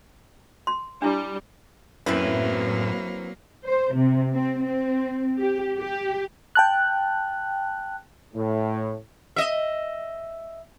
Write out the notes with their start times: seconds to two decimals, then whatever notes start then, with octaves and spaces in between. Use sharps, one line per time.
0.67 C6
1.02 G3 D4 E4
2.06 F#2 A2 F#3 A#3 C4 E4 B4
3.66 C5
3.95 C3
4.33 C4
4.64 C4
5.40 G4
5.77 G4
6.55 G5 A5 F#6
8.34 A2
9.36 D#5 E5